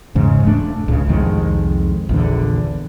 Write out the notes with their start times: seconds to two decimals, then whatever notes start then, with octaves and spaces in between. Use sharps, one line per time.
0.15 E2 G#2 C#3
0.43 E1 A3 D4
0.88 C#2 A2 C#3
1.09 C2 F2 D#3 G#3
2.09 A#1 E2 D3